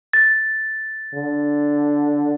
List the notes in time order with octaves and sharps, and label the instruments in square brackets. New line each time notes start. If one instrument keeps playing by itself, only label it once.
[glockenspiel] A6
[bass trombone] D3